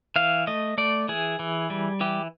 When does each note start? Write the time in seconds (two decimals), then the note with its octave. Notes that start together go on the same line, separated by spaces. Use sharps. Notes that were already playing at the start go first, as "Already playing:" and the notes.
0.16 E3 F5
0.47 A3 D#5
0.78 A3 D5
1.08 E3 G#4
1.39 E3
1.70 G3
2.01 E3 G4